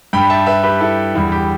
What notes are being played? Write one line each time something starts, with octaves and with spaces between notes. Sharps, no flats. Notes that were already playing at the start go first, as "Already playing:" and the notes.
G2 G3 G5 B5
E5 A5
B4 E5
G4 B4
E4 A4
E2 D3 G3 E4
G4